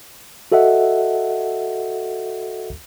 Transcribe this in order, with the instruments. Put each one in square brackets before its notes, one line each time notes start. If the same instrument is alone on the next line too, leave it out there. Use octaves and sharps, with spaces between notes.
[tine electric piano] F#4 A4 D#5 E5 F#5